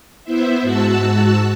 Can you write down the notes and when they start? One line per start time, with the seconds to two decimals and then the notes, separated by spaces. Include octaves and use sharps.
0.24 B3 E4 C5 E5
0.62 G#2 F#4 A5 E6 F#6